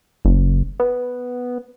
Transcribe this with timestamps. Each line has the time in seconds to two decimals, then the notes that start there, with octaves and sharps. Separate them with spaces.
0.25 F#1
0.80 B3